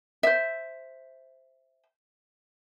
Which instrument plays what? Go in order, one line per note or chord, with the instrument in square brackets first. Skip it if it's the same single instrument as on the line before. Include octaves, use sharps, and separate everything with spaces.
[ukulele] C5 E5